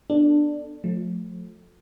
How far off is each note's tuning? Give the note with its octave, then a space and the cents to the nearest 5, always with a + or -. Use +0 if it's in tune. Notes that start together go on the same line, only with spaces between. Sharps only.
B3 +0 D4 +10 A4 +15
F3 +35 A3 +0